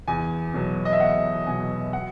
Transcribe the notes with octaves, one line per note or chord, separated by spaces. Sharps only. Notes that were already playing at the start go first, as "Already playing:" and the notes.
E2 G#5
B2 F#3
D#5
E5
E2 F#5
B2 F#3 G#5
F#5